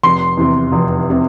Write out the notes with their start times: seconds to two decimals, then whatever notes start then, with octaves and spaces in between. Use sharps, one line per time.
0.03 F1 C6
0.37 E2 C3
0.72 F1
1.10 C3